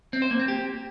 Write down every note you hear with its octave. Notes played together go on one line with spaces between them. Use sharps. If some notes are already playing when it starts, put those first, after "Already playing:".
C4
C5
A#3
C4
G4